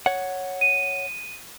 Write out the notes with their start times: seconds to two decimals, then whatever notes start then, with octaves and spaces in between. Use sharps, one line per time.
0.06 C#5 F#5
0.61 D#7